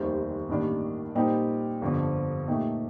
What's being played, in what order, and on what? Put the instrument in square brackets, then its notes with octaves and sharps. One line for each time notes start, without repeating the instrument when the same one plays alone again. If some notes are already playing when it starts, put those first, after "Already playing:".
Already playing: [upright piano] F1 D#2 D#3 G3 C4
A1 G2 D#3 A#3 D4
A#2 G3 C4 D#4 G4
G1 F2 D3 F3
A#2 A3 D#4 G4